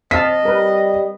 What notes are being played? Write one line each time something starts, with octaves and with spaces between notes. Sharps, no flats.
C4 D#5 F5 A5 B6
G3 A#4 B4